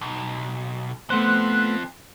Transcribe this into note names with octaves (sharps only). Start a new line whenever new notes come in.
B1
F3 A3 B3 C4 C5 F#6